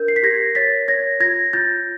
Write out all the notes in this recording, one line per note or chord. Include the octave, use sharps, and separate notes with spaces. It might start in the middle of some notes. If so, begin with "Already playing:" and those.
Already playing: D4 A#4 G6
C7
B6
G4 G#6 A#6
C#5 A6 B6
C#5 G#6 A#6
F4 G#6 A#6
F4 G6 A6